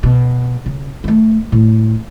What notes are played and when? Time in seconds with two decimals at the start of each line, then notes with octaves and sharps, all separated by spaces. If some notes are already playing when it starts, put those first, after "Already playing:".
0.03 B2
0.66 C#3
1.04 G#3 A3
1.52 A2